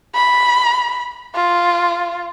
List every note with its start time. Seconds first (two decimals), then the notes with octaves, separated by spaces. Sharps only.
0.15 B5
1.35 F4